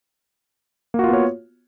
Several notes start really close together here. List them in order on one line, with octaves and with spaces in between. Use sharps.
A#3 F#4 F4 B3 C#5